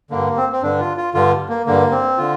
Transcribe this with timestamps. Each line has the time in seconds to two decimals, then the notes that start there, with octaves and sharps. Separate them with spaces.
0.11 G2 D3 A#3
0.37 C4
0.52 C4
0.62 G2 D3 D4
0.80 F4
0.97 F4
1.14 G2 D3 F4
1.49 A#3
1.66 G2 D3 A#3
1.92 C4
2.17 D3 F4